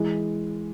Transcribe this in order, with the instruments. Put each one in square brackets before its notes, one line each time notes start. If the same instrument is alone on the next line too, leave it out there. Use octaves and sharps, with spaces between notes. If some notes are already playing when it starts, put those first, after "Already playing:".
Already playing: [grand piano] E3 G#3